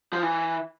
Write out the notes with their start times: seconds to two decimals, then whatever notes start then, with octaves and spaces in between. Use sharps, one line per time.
0.13 F3
0.23 E3